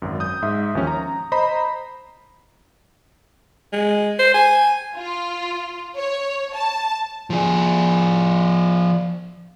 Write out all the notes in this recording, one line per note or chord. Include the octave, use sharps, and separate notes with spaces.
G#1 F#2
D#6 G6
G#2 E5
D#2 F3 C#4
A#5
C5 D#5 A#5 B5
G#3
C5
G#5
F4
C#5
A5
F3 G#4